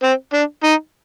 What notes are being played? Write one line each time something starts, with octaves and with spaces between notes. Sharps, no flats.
C4
D4
D#4